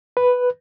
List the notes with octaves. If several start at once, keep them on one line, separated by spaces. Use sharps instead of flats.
B4